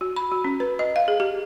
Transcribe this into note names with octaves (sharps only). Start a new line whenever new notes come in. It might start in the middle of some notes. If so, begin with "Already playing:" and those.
F#4
B5
F#4
C#4
B4
D#5
F5
G#4
G4